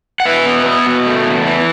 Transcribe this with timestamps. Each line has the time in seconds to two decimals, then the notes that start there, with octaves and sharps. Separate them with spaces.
0.20 F#5
0.25 B2 B4 E5
0.46 B3
0.66 B3
0.86 B2
1.06 A3
1.26 E2
1.47 E3